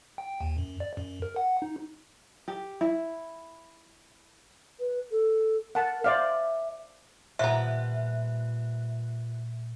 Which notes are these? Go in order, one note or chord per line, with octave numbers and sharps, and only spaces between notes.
G5
D#2
F#2
D5
F#2
A#4
F#5
D#4
G4
E4
B4
A4
A#4 F#5 A5
C5 D5 E5 F5
A#2 F3 G3 B3 E5 A#5 F#6